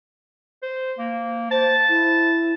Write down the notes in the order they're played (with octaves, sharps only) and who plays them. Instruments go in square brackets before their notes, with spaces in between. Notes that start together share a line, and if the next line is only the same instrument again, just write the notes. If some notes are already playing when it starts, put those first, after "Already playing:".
[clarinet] C5
A#3
[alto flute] C5 [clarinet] A5
[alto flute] E4